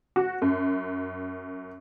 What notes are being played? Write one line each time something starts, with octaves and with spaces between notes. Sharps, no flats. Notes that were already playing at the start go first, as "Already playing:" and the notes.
F#4
F#2